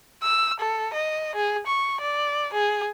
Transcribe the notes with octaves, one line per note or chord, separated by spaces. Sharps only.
E6
A4
D#5
G#4
C#6
D5
G#4